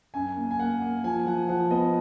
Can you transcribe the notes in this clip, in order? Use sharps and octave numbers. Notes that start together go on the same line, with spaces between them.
F#2 G#5
A#3
G#5
A#3 F#5
A#3
F3 G#5
F3 F#5
F3 F#5
B3 D#5